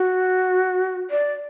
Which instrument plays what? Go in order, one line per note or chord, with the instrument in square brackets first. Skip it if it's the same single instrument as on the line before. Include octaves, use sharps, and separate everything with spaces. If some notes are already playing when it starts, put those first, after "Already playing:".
Already playing: [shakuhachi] F#4
D5